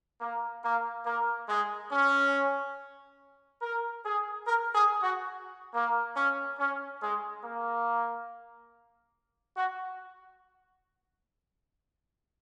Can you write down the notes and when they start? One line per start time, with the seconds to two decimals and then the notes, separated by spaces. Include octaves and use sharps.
0.21 A#3
0.63 A#3
1.06 A#3
1.49 G#3
1.91 C#4
3.62 A#4
4.04 G#4
4.46 A#4
4.75 G#4
5.03 F#4
5.74 A#3
6.16 C#4
6.59 C#4
7.01 G#3
7.44 A#3
9.57 F#4